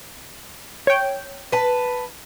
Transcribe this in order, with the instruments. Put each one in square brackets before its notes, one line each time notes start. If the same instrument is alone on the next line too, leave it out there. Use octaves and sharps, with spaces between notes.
[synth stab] C#5 G5
[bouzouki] B4 A5